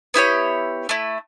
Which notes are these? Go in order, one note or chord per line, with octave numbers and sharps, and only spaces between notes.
B3 E4 G4 C#5
A3 E4